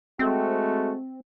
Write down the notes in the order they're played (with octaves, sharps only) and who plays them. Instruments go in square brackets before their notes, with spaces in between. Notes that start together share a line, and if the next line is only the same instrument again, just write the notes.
[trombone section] G#3 A3 F#4 [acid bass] C4